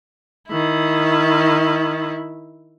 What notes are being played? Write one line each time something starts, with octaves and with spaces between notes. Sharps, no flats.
D#3 E4